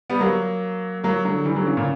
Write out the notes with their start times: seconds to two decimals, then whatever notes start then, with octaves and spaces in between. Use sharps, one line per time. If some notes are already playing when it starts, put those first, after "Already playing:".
0.10 G3 B3
0.20 F#3 A#3
1.04 F#3 A#3
1.25 D3 F#3
1.45 E3 G3
1.56 D3 F#3
1.66 C#3 E3
1.77 A#2 C#3